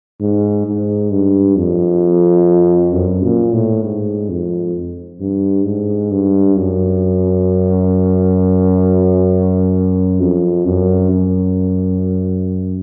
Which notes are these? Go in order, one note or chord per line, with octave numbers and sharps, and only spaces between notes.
G#2
G#2
G2
F2
F#2
A#2
A2
G#2
F2
G2
G#2
G2
F#2
F2
F#2
F#2